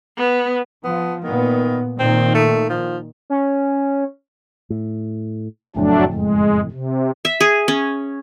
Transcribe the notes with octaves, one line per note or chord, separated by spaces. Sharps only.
B3
F3 B3
A#2 D#3 B3
A#2 D#3 C4
A3
F3
C#4
A2
F#1 F2 A2 F#3 A3 D4
G#3
C3
E5
G#4
C#4